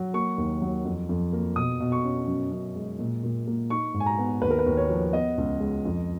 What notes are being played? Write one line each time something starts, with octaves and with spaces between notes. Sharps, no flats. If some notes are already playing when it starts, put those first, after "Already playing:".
Already playing: F#3
A#3 C#6
D#2
F#3
F2
F2
A#3
B2 D#6
B2
C#6
C#4
F#2
F#2
G#3
A#2
A#2
A#3
D#4 C#6
G#2
G#5
A#5
B3
D#2 B4
A#4
B4
D#2
C#5
F3
B3 D#5
C#2
G#3
F2